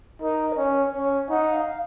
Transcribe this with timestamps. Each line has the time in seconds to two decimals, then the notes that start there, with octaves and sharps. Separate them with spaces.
0.21 D#4 A#4
0.52 D#5
0.57 C#4 C#5
0.93 C#4 C#5
1.29 D#4 F#5
1.53 F5